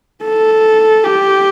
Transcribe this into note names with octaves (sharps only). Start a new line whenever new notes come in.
A4
G4